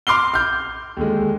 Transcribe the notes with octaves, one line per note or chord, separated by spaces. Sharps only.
C6 D6 F6 C7 G7
F6 G6
D#2 D3 G#3